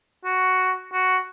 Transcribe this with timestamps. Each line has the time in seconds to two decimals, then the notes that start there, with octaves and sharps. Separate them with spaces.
0.25 F#4
0.93 F#4